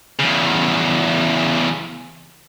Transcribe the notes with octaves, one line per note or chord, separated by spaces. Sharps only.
E2 C#3